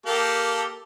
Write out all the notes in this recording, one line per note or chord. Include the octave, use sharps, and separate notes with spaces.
A#3 G4 A4